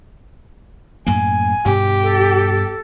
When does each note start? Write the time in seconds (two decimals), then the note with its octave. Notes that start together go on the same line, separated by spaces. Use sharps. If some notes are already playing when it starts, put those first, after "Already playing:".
1.07 F#2 A2 A#3 G#5
1.65 G2 B2 G4
2.03 A4